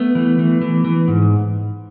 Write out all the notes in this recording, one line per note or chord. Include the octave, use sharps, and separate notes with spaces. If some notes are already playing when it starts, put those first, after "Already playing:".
Already playing: A3 B3
E3
E3
E3
E3
G#2